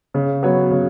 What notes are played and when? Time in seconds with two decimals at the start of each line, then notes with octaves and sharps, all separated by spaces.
0.14 C#3
0.43 F#3 B3 F#4 C#5
0.71 C#3